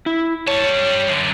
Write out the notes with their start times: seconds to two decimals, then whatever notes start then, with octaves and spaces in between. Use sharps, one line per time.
0.06 E4
0.47 G3 C#5 A5
1.09 F#2 D3